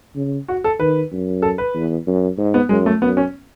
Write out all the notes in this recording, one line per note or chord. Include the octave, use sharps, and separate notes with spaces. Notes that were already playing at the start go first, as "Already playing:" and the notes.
C#3
F#4
A4
D#3 B4
F#2
A4
B4
E2
F#2
G#2
B3
F#2 G#3
A3
F#2 B3
C#4